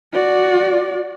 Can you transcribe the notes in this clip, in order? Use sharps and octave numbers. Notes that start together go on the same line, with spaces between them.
F#4 D5